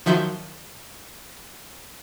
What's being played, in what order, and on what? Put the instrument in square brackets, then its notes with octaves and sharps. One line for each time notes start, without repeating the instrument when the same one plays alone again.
[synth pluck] D#3 F3 F#3 E5 C6 G6